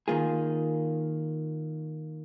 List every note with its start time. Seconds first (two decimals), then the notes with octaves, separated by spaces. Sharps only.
0.08 D#3 A#3 F4 G#4